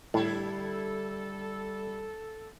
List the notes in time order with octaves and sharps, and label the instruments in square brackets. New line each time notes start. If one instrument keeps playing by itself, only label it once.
[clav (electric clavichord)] A2 [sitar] D3 E4 G4 [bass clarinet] G3 [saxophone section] A4